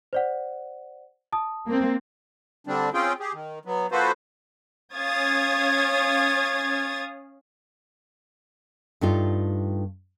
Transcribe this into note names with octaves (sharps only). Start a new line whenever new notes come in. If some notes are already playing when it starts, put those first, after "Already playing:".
C5 D5 F#5
A5 D#6
A#3 C4
D3 G3 C4 D4
C4 C#4 F4 G#4 G5
G4 G#4
D#3
F#3 B3
F3 A#3 F#4 A4 B4 C5
C#4 C#5 F5 D#6 G#6 A6
G2 A3 D#4 F4